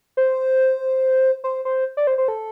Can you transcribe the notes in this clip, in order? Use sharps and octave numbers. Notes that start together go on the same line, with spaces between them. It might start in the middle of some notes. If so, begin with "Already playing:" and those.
C5
C5
C5
D5
C5
C5
A4